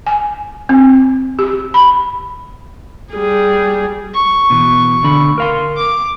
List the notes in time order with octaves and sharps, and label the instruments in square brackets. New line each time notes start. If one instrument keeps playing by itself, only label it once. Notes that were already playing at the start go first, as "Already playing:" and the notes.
[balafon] G#5
C4
G4
B5
[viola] G3 G#4
[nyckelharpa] C#6
[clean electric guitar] B2 D#3 E3
D2 D3 B5
A#4 F5 C6
[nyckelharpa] D6